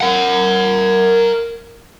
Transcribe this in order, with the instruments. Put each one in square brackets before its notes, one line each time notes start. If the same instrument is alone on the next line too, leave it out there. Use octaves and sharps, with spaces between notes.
[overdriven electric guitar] A#4 F#5